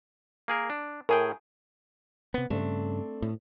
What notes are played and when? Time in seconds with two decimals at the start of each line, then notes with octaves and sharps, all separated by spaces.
0.48 A#3 G#4 A#4
0.70 D4
1.09 A2 G#4 A#4 G5 G#5
2.34 C3 B3
2.50 G2 C#3 A3 C4 D4
3.22 A2